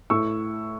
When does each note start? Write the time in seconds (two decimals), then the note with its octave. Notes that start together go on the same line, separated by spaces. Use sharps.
0.10 A2 C#6 E6